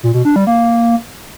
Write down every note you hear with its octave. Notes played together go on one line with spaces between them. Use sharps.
A#2
B2
D4
G3
A#3